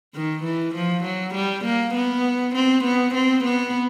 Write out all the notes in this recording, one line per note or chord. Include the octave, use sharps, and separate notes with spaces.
D#3
E3
F3
F#3
G3
A#3
B3
C4
B3
C4
B3